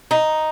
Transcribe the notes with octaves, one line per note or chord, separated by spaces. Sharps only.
D#4